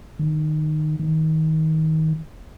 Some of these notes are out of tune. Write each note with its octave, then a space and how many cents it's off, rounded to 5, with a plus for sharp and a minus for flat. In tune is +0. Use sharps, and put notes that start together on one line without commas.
D#3 -20
D#3 +25